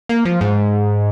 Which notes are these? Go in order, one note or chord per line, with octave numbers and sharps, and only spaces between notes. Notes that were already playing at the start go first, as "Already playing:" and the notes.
A#3
F3
G#2